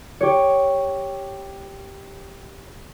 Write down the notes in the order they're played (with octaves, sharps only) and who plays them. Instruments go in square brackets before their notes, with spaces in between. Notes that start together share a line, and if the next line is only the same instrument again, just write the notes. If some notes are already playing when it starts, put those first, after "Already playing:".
[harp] G4 C#5